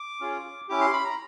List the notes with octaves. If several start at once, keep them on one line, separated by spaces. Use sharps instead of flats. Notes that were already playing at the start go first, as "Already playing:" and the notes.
Already playing: D6
C#4 F4 G#4
C#4 E4 G4 D6
C6
B5
A#5